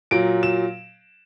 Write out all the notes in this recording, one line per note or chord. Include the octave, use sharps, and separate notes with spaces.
A#2 F#3 D7
E7